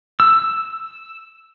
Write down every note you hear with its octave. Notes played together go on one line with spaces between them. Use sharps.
E6